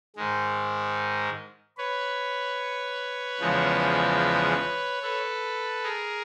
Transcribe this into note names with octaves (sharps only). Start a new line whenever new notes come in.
G#2 D#3 G#3
B4 C#5
E2 C#3 F3 G#3
A4 B4
G#4 A#4